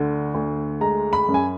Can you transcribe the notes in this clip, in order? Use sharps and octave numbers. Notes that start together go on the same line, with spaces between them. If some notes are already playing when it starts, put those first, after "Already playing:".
Already playing: D2 D3
D2
G#3 A#5
B5
F#2
G#5